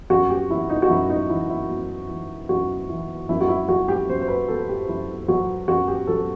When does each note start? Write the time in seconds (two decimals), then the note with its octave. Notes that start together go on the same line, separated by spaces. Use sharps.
0.10 F#2 F#4
0.30 G4
0.50 E3 E4
0.69 D#4
0.82 F#4
0.90 F#2 E4
1.10 D#4
1.29 E3 E4
1.49 E4
1.70 F#2
2.09 E3
2.49 F#2 F#4
2.89 E3
3.29 F#2 E4
3.41 F#4
3.49 E4
3.69 F#3 F#4
3.88 G4
4.09 F#2 C5
4.21 C5
4.28 B4
4.48 F#3 A4
4.69 G4
4.89 F#2 E4
5.28 F#3 F#4
5.68 F#2 F#4
5.88 G4
6.07 F#3 A4